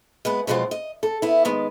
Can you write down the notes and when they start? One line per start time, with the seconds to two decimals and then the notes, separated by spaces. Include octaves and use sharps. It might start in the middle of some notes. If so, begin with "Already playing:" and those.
0.25 G#3 B3 B4
0.47 B2 F3 F#3 G#3 C4 F4
0.71 D#5
1.03 A4
1.22 B3 E4
1.45 D#3 G#3 B3